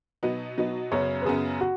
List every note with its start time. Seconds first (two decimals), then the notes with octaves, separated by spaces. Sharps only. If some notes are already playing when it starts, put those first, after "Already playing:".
0.23 B2 F#3 B3 D#4
0.57 B2 F#3 B3 D#4
0.92 F#2 C#3 B3 C#5
1.22 B4
1.25 F#2 C#3 B3 G#4
1.61 F#4